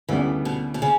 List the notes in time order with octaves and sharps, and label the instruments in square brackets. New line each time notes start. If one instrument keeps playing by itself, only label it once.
[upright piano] D2 C#3 G3 B3 D4 [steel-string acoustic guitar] E3
[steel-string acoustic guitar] B2
B2
C#3